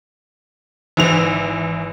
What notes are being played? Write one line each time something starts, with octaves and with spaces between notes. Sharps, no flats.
G#1 E3 F7